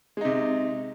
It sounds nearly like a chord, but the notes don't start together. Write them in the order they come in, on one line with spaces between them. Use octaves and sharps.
G#3 D#4 C3